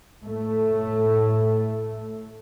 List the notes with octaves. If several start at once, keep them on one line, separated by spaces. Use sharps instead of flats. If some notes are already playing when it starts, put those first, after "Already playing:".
A2 A3